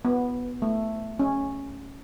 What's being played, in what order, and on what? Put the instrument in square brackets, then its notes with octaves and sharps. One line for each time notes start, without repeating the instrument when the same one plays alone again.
[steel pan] B3
A3
C#4